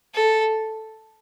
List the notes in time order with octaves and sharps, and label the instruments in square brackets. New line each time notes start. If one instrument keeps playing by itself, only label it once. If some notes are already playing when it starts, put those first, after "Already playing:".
[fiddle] A4